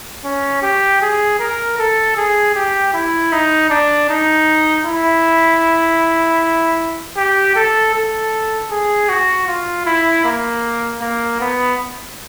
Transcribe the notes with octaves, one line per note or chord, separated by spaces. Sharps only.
C#4
G4
G#4
A#4
A4
G#4
G4
E4
D#4
D4
D#4
E4
G4
A4
A4
G#4
F#4
F4
E4
A#3
A#3
B3